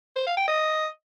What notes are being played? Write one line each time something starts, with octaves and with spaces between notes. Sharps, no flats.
C5
F5
G5
D#5